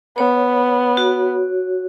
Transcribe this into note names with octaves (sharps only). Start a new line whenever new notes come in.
B3 C#5
F#4